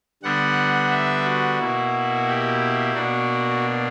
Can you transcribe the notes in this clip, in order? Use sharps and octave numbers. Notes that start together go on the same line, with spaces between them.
D3 G3 B3 D4 F#5
E5
F#4
B2 A#3 E4
G4
B2 A#3 D4 F#4